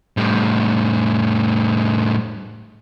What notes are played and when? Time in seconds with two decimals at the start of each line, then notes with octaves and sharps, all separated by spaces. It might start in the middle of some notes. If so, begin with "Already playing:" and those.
0.17 A2 G3